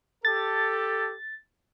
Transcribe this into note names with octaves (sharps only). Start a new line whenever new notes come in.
G4 A4 A6